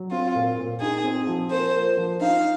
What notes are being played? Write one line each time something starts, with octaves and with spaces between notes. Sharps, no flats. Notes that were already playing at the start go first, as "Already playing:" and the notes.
Already playing: F#3
C4 F4
A#2
A#2
D#4 G#4
C4
F3
A#3 C5
A#3
F3
D#4 F5